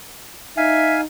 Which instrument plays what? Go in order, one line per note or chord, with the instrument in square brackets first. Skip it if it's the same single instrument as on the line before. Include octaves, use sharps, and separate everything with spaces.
[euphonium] D#4 [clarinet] E5 [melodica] F5 G#5